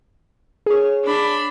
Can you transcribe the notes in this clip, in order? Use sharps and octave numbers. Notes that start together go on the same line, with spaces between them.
G#4 C#5
D4 B5